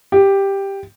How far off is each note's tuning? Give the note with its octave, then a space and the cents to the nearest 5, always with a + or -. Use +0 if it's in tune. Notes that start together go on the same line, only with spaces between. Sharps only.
G4 +5